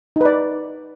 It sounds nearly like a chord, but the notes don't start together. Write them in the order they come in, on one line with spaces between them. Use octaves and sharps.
D#4 B4 D5